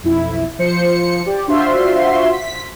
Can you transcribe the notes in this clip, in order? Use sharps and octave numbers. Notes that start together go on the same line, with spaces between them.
B1 F2 E4
F3 C5 C#7
G4 D5
D4 F4 F#4 C5 E5 C6
B6